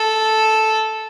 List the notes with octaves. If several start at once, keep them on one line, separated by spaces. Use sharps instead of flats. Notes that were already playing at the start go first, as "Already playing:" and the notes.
Already playing: A4